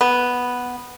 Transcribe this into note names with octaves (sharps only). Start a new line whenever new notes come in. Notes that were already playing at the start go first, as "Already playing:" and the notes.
B3